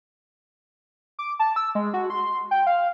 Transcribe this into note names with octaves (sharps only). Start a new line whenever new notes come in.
D6
A5
E6
G#3
F#4
C6
G5
F5